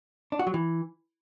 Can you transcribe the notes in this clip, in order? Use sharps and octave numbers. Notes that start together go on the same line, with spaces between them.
D4
F#4
F#3
E3